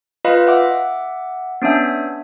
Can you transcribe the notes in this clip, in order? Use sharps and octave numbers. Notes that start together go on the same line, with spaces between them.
F4 B4 D#5 F5 B5
E5 F#5 D6
B3 C#4 D4 E5 G#5